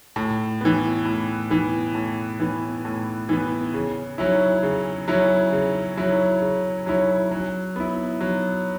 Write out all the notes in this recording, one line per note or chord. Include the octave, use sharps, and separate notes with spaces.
A2
E3 B3
A2
E3 B3
A2
E3 B3
A2
E3 B3
C#3
F#3 C#4 E4
C#3
F#3 C#4 E4
C#3
F#3 C#4 E4
C#3
F#3 C#4 E4
F#3
B3 E4
F#3